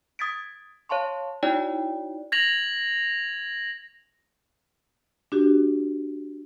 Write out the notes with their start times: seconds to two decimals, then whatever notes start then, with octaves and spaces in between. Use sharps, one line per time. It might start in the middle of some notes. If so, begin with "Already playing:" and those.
0.19 D#6 G#6 A6 B6 D7
0.89 C#5 F5 A5 C6 C#6
1.43 D#4 E4 F#4 C#5 D5 G5
2.32 G#6 A#6 F7 F#7
5.32 D4 F#4 G4